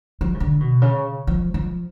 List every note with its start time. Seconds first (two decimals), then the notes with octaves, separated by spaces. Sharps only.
0.21 F3
0.34 C#3
0.40 D3
0.60 B2
0.82 C#3
1.27 F3
1.54 F3